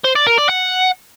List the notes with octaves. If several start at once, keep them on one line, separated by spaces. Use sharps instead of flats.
C5
D5
A#4
D5
F#5